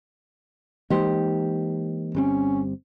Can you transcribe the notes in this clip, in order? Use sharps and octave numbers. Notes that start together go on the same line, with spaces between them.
E3 G#3 A#3 D#4 G4 C5
G1 G3 C4 C#4